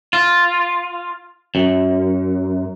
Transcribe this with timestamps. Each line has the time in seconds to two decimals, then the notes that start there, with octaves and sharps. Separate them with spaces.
0.13 F4
1.55 F#2